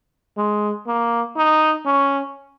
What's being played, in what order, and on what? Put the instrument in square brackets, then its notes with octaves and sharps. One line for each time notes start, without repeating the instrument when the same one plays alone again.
[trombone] G#3
A#3
D#4
C#4